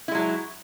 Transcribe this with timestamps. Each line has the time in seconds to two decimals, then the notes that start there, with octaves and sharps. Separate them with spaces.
0.08 E4
0.11 G#3
0.15 F#3